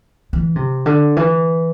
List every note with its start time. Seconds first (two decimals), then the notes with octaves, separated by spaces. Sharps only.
0.33 E3
0.56 C3
0.86 D3
1.16 E3